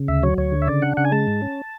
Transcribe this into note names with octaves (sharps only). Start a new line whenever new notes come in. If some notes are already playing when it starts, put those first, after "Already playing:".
Already playing: C#3
D2 E5
F#3 C#5
D2 C#5
D3
E5
C#3 D5
D4 F#5
C#3 F#5
G#5
G#3 A5
G#2
C#4